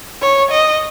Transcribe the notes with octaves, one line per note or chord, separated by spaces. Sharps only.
C#5
D#5